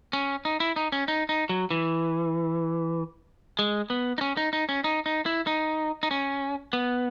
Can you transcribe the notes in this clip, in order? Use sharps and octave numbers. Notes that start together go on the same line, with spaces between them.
C#4
D#4
E4
D#4
C#4
D#4
D#4
F#3
E3
G#3
B3
D#4
C#4
D#4
D#4
C#4
D#4
D#4
E4
D#4
D#4
C#4
B3